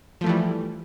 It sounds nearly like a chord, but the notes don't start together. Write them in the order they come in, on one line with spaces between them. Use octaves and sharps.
F3 A3 E3 G3